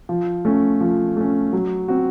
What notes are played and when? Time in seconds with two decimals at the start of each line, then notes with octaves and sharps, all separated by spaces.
0.09 F3
0.45 A3 C#4
0.81 F3
1.17 A3 C#4
1.53 F#3
1.88 C4 F#4